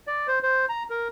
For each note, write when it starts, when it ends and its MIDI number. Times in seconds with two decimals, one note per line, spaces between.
0.07 0.27 74
0.27 0.39 72
0.43 0.65 72
0.69 0.83 82
0.90 1.08 70